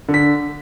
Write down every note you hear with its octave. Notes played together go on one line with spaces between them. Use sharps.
D3
B6